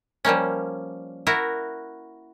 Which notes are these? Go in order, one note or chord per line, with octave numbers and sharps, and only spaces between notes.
F3 G3 A#3 C#4
E4 F#4 A#4